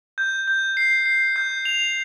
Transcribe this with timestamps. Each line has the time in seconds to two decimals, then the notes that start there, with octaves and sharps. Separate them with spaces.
0.18 G6
0.48 G6
0.77 C7
1.06 C7
1.36 G6
1.65 F7